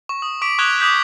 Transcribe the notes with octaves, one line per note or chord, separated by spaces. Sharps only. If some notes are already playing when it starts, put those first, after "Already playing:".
C#6
D#6
C#6 D6 B6 D7
C#6 D#6 F#6 G#6 F7 G7
D6 D#6 G6 B6